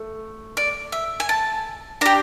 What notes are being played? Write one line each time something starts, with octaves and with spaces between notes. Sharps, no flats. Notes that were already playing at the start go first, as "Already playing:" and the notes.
Already playing: A3
D5
E5
G#5
A5
D4 G4 A#5